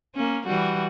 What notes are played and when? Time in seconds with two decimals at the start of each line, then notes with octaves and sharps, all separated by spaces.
0.15 A#3 C#4
0.46 E3 G3 F#4